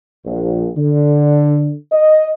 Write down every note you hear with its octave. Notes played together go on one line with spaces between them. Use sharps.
A#1
D3
D#5